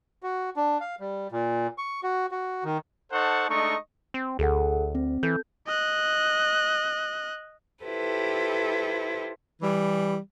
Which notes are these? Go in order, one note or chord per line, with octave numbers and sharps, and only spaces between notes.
F#4
D4
F5
G3
A#2
C#6
F#4
F#4
D#3
D#4 A4 C5 F#5 A5 C#6
G#3 A3 D4 D#4 D#5 C#6
C4
D2 G#4 A4 F#5
C4
E3 A4 G6
D#5 F#6
E4 F4 G4 A4 B4 C5
E3 G3